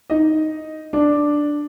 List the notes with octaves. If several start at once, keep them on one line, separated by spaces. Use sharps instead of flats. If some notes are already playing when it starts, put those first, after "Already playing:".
D#4 D#5
D4 D5